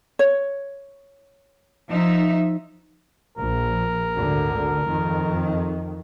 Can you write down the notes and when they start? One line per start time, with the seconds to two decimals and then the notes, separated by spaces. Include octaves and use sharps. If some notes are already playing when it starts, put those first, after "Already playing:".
0.19 C#5
1.89 F3 D#4 E5
3.38 A#1 A#4
4.16 G#1 D2 D3
4.88 F2 D#3